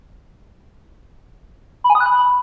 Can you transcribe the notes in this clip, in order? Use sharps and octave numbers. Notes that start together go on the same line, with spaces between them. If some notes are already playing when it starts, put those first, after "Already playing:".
B5
G#5
D#6
F#6
B5